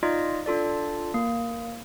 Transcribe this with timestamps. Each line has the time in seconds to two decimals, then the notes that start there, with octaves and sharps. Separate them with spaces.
0.03 D#4 F4 D5 D#5
0.46 D4 F4 A4 D5
1.14 A#3